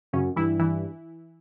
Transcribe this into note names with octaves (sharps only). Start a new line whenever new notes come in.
F#2 C#3 C#4
G2 E3 E4
E3 E4